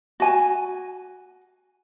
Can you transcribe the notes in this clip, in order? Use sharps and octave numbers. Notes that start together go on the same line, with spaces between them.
F#4 G#5